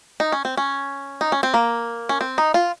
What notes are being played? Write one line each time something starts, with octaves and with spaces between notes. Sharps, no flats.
D#4
C#4
C4
C#4
D#4
C#4
C4
A#3
C#4
C4
D#4
F4